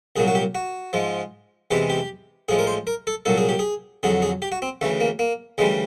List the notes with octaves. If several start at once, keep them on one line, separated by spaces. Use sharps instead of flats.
C2 A#2 F#3 G#4
F#4
G4
F#4
G#2 F3 G#3
E2 C3 E3 G#3 G4
G4
A2 F3 G#3 G#4
A#4
C5
A#4
A4
C2 A#2 F#3 A4
G#4
G4
G#4
F2 D3 F#3 G#4
G#4
G4
F#4
C4
D2 C#3 E3 A3
A#3
A#3
D2 C#3 E3 G3 G#3